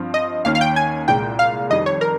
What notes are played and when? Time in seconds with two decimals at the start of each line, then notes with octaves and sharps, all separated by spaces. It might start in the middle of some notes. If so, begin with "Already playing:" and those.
Already playing: G2 F3 C4 F4
0.14 D#5
0.45 D#2 D#3 A#3 C#4 F5
0.55 F5
0.61 G5
0.76 G#5
1.08 C2 A#2 G#3 G5
1.39 F5
1.70 F2 D#3 G3 D#5
1.86 C#5
2.01 A#4